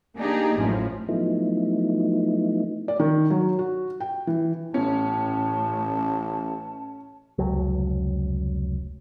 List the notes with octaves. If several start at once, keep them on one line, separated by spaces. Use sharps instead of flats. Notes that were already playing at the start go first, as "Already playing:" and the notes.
A#3 D4 D#4 G4 G#4
A1 F#2 A2 F3
F3 F#3 A3 B3 D#4 E4
D5
D#3
F#3
F#4
G5
E3
A1 A2 C#4 A5
F1 C#2 F#3